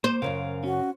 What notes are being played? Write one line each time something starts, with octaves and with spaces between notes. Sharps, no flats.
A#3 C5
F#2 A#2 C#3 A#4 F5
C#4 F#4